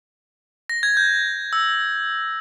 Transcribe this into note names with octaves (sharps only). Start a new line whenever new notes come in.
A#6
G#6
G6
E6